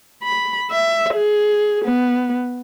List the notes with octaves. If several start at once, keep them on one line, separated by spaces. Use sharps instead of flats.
B5
E5
G#4
B3